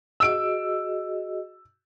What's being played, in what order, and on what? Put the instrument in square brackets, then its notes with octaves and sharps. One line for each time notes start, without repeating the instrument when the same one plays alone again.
[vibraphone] F#4 G#4 D#5 [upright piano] E6 D7